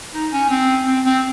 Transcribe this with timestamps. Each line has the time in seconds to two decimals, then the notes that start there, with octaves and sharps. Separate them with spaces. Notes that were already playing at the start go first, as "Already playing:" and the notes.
0.14 D#4
0.32 C#4
0.50 C4
0.87 C4
1.05 C4